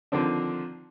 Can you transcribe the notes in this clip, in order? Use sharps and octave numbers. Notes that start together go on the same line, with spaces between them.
D3 D#3 F3 C4 D4